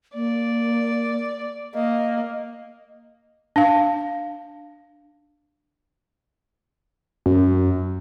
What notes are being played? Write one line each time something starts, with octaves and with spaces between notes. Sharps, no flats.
A#3 D5
A#3 D#5
D4 F5
F#2